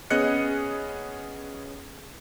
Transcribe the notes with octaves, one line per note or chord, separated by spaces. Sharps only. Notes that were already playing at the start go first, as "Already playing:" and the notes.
B3 C#4 G#4 D#5 F#6 C#7